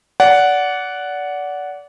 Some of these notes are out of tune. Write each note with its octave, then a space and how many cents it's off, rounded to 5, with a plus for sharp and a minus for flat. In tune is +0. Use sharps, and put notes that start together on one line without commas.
D5 -25 F#5 +0